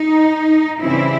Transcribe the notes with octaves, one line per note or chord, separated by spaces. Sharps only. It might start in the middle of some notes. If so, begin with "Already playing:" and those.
Already playing: D#4
C#3 E3 G3 C4 E4